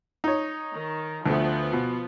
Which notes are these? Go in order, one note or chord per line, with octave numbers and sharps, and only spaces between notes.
D#4 C#5
D#3
D2 F3 A3 B3
B2